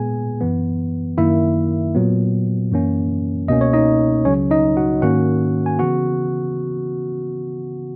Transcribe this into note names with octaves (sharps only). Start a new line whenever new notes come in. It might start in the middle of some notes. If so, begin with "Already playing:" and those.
Already playing: A#2 G#3 B3 G#4 G#5
F#2 E3 B3
F#2 D#3 A#3 E4 E5
A#2 F#3 B3
F#2 E3 A#3 C#4
C#2 B2 A#3 C#4 D#5
C#5
D#4 D#5
C#2 C#3 F#3 C#4 C#5
D#4 D#5
F#4 F#5
G#2 D#3 A#3 C#4 F#4 F#5
G#5
C#3 E3 B3 F#4 F#5